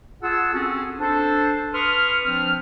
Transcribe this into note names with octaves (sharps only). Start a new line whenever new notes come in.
F4 G#4 F#5 A5 E6
C4 C#4 F#4 G#4 A4
D4 A4 C5
B4 C6 C#6 D#6 F6
F3 C4 D4 F6